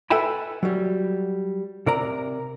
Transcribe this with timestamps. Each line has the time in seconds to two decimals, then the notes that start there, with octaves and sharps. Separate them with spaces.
0.10 A4 B4 E5 G5 G#5 B5
0.63 F#3 G3
1.87 C3 A#4 D5 A#5